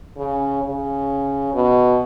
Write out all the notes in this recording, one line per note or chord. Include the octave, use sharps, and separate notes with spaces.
C#3
C#3
B2